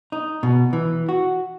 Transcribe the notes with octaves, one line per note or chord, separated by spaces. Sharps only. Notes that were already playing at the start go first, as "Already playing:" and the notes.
D#4
B2
E3
F#4